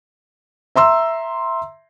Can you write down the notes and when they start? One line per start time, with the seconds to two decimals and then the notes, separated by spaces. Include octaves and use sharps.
0.76 E5 A#5 C6 E6